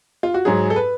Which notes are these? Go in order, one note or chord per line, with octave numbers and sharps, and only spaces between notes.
F4
F#4
G#2 F#3 G#4
A4
B4